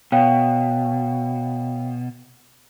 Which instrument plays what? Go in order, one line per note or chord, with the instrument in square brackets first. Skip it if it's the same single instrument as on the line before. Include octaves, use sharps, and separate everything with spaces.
[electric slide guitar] B2 [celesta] C#5 F5 G5